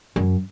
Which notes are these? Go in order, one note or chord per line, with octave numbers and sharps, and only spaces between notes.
F#2